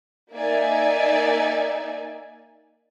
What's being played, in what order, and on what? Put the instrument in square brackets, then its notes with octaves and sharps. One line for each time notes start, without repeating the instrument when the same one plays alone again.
[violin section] A#3 D#4 D5 E5 G#5